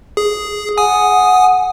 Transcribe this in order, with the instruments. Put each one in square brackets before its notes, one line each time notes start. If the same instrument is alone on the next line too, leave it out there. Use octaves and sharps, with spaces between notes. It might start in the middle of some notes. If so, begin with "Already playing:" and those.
[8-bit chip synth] G#4
[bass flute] F#5 [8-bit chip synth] G#5 D#6